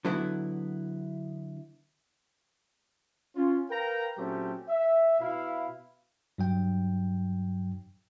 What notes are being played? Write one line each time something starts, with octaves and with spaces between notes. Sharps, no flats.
D3 F#3 B3 E4
C#4 F4
A#4 B4 F5 G5 A#5
A#2 F#3 A3 C4 C#4 G4
E5
B2 E4 F5
G2 F#3 G5